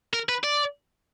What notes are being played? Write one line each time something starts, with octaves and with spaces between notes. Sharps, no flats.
A#4
B4
D5